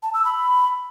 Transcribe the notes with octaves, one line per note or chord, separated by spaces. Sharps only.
A5
E6
B5